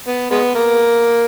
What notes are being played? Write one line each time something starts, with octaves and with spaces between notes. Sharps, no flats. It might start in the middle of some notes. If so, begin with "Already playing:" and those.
B3
G#3 B3
A#3